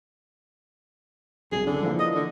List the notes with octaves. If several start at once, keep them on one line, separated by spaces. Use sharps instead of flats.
C2 F#2 G#4
D3
E3 F3 A#3
D#5
D3